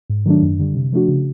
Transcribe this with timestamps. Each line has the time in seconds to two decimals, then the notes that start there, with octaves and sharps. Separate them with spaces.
0.10 G#2
0.26 D#3 F#3 A3 D4
0.42 F#2
0.59 D3 G3
0.75 C3
0.93 F3 A3 D4 F#4
1.08 C#3